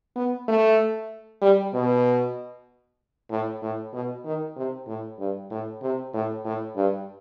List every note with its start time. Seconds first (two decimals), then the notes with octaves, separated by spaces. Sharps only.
0.16 B3
0.48 A3
1.42 G3
1.74 B2
3.30 A2
3.62 A2
3.94 B2
4.25 D#3
4.56 C3
4.88 A2
5.19 G2
5.51 A2
5.82 C3
6.14 A2
6.45 A2
6.76 G2